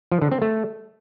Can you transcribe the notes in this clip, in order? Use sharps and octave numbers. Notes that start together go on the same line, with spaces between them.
F3
D3
C4
A3